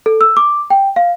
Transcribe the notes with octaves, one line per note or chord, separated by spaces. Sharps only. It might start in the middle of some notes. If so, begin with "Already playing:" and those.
A4
E6
D6
G5
F5